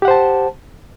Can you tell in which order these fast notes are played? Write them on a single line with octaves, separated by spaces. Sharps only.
G4 F#5 C5 A5